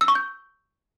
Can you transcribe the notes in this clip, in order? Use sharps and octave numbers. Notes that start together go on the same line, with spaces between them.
E6
C#6
G6